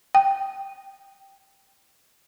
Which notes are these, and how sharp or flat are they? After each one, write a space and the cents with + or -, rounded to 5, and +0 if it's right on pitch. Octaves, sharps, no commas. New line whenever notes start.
G5 +0